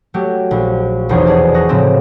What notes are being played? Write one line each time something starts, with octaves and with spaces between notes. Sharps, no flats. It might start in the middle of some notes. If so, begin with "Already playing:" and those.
F#3 A3 F#4 G4
A#1
F1 B1 E2 G#4 C5 C#6
G#4 D5 A5
A#5 C#6 D#6 F#6 A#6
A2 C#3 F3 F#3 B3 C4